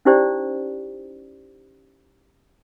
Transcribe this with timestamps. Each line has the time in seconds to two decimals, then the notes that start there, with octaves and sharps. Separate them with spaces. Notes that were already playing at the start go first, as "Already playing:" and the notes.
0.05 C#4 D#4 E4 G4 C5 D5